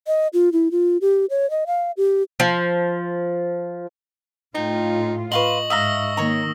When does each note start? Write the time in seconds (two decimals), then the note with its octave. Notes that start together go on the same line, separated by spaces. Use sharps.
0.07 D#5
0.33 F4
0.52 E4
0.71 F4
1.01 G4
1.30 C#5
1.50 D#5
1.67 F5
1.97 G4
2.40 F3
4.55 A2 D#4 F4 G5
5.32 B4 D#5 F5 C6 C#6 F#7
5.70 G#2 E5 F5 A#5 D#6 E6 A#6
6.17 D#3 A#3 C#5 A#5